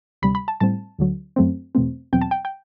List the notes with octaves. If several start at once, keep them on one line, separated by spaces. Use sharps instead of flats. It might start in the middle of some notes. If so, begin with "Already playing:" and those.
D2 C3 G3 B5
B5
A5
A2 G3 C4 A5
D2 D3 F#3
F#2 F#3 A3 C4
E2 B2 A3 C4
E2 B2 F#3 C4 G5
A5
G5
G5